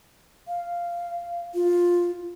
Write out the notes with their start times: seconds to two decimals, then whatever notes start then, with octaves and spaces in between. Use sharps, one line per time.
0.48 F5
1.54 F4